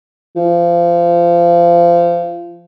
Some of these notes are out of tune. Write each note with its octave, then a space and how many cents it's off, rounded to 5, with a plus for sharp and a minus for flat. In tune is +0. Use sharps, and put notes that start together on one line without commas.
F3 -25